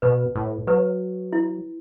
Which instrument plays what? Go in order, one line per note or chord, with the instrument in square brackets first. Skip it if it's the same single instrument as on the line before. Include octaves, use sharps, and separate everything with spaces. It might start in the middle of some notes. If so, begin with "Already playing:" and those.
[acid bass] B2 [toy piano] B4
[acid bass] A2
[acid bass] F#3 [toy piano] B4
[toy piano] E4